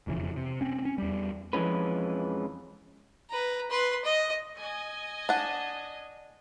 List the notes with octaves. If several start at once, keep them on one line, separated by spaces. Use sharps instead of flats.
E1 F2 C#3 E3
C3
C4 C#4
C4 C#4
E2 G3
F2 E3 F3 G#3 C#4 B4
B4 A#5
B4 C6
D#5
D#5 G#5
D4 F#5